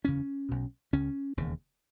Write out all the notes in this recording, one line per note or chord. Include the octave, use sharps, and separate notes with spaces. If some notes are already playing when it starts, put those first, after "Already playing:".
F#1 E2 C#3 C#4
B1 B2
C#2 C#3 C#4
E1 D#2 C#3